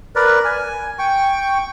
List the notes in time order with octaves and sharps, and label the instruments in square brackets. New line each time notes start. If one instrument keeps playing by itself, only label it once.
[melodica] A#4 B4 D5
G#5
G5 C#6